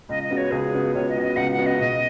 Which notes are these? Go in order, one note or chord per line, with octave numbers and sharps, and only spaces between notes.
C#2 D#5
D#5
C#3 B3 F#4
C#5
C#2 G#4
C#3 B3 F#4
C#2 C#5
D#5
C#3 B3 F#4
D#5
C#2 F#5
F#5
C#3 B3 F#4
D#5
B2 D#5